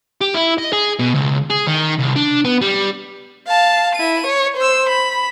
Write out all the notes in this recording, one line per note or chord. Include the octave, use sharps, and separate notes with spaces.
G4
E4
D#5
G#4
B2
C#2
G#4
D#3
C2
D4
B3
G3
F5 A5
E4 D#7
C#5
C5 E6
B5